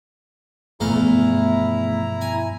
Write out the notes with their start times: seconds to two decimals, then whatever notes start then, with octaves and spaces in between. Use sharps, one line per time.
0.80 E2 G2 B2 F3 A3 E4 F5 A#5
2.21 G#5